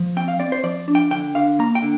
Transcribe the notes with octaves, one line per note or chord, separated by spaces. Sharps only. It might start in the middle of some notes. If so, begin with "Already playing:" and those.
Already playing: F3
C4 G5
F5
C4 D5
C5
F3 D5
D4
G5
D3 G5
D3 F5
A#3 A#5
G5
D3